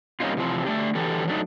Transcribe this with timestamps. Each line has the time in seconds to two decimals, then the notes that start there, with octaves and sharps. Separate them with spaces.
0.20 G3 A#3 C4 C#4 D#4 F4
0.37 C3 E3 F3 C4
0.65 A3 D4 G4
0.95 D3 E3 F#3 G4 A4
1.28 F#3 A3 D4 D#4